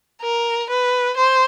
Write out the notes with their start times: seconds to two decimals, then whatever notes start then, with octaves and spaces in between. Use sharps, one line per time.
0.22 A#4
0.70 B4
1.17 C5